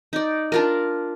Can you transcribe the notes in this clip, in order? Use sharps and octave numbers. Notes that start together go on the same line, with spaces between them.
D#4 D5
D4 F4 A#4